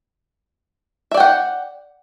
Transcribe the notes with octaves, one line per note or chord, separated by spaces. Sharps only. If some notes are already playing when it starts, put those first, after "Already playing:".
D5 E5 F#5 G5